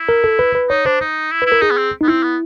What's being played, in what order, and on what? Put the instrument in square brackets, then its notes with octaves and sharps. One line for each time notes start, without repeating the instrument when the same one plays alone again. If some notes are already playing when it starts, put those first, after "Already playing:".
Already playing: [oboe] E4
[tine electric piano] A#4
A4
B4
B4
[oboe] D#4 [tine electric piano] C#5
[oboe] D4 [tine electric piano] C5
[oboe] D#4
E4
[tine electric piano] B4
[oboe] E4
[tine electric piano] A#4
[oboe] D#4 [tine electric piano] G#4
[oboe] B3
C4
[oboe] B3 [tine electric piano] D#4
[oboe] C4 [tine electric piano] E4
[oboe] B3